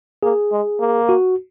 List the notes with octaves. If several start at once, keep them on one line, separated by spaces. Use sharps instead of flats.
A#3 G#4
G#3
A#3
F#4